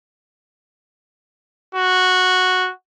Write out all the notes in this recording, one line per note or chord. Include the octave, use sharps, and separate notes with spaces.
F#4